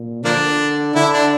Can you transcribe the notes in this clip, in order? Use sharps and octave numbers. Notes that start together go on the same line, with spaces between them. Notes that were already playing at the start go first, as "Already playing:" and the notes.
Already playing: A#2
D3 F3 A#3 D4
D3 E4
D4